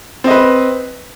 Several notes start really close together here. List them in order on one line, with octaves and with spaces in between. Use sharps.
C4 D#5 B4